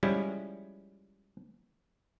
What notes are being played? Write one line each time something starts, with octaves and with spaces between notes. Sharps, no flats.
F3 G3 G#3 C#4 E4